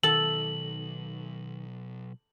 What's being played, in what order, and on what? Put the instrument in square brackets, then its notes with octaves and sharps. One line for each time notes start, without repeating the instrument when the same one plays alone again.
[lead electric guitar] B1 [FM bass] D#3 [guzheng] A4 [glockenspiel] F#7